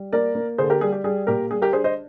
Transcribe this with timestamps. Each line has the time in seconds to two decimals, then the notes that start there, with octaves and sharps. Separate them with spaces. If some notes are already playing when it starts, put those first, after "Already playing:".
Already playing: G3
0.13 A#3 A#4 D5
0.35 A#3
0.58 D3 G#4 C5
0.70 G4 A#4
0.81 G3 G#4
0.92 G4
1.04 G3 G#4
1.27 A#2 G4 A#4
1.51 G3 G#4
1.62 G4 A#4
1.73 D4 G#4 C5
1.84 C5 D#5